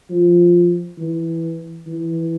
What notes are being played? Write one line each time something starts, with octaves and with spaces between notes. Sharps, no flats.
F3
E3
E3